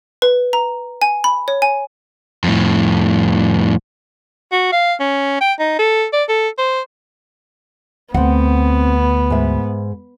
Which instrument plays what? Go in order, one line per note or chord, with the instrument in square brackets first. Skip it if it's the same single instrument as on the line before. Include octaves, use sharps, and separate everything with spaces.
[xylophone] B4
A#5
G#5
B5
C#5
G#5
[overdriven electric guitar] F2 A2
[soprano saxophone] F#4
F5
C#4
G5
D#4
A4
D5
A4
C5
[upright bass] D2 [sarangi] B3 [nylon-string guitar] C4 F#5
[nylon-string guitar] G#2 E5